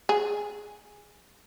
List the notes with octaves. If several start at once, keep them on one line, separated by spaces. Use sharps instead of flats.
G#4